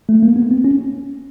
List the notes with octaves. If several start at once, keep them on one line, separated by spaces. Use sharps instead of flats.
A3
A#3
B3
C4
C#4